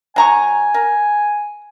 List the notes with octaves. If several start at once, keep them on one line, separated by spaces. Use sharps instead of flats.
F#3 G#5 A#5 C#6
A#4